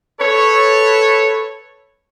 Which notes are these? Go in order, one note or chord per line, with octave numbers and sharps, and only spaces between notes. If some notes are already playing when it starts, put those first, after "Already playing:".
A4 B4 C#5